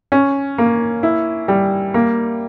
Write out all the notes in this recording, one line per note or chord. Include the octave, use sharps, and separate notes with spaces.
C#4
A#3
E4
G3
A#3